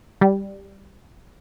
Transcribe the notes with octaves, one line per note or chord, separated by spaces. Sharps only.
G3